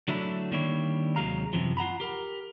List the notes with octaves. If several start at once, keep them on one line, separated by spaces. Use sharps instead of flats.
D3 F#3 A3 D4 E4
D#3 G3 A#3 D4 E4 C#5
D#2 C3 F#3 G#3 F5 A#5
F#2 A2 C3 E3 F3
F4 F#5 A#5 B5
G4 A#4